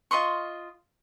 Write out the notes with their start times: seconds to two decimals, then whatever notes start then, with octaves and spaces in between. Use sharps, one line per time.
0.11 F4 D#5 C6 C#6